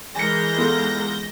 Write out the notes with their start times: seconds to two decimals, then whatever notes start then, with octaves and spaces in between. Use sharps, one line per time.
0.15 E3 G#3 A#4 G#5 G6 A#6 C#7
0.57 B3 F4 A4